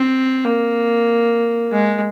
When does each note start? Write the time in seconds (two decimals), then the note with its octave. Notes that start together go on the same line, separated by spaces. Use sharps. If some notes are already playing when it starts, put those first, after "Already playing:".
Already playing: C4
0.45 A#3
1.72 G#3